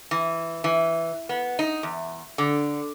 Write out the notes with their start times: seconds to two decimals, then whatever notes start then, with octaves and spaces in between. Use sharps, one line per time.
0.11 E3
0.64 E3
1.29 B3
1.59 D#4
1.83 E2
2.38 D3